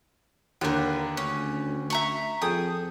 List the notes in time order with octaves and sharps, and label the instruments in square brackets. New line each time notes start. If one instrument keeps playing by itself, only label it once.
[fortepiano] D#2 D3 [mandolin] A#4 B4
[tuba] D2 [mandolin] C#4
[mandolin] E5 A#5 C#6
[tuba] F2 [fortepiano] G#4 A4 G5 [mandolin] D#6